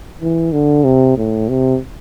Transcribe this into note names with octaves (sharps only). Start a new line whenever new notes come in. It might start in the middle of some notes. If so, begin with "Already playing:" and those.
E3
D3
C3
A2
C3